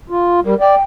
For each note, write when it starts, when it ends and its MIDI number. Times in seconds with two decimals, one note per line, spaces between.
0.10 0.40 65
0.45 0.54 55
0.45 0.59 70
0.60 0.75 74
0.60 0.83 79